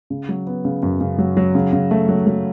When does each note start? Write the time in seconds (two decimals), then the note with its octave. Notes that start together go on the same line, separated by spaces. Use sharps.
0.10 C#3
0.29 F#3
0.47 B3
0.65 C#3
0.83 F#2
1.01 C#3
1.18 F#3
1.37 F#3
1.55 C#3
1.73 C#3
1.91 A3
2.09 F#3
2.27 F#3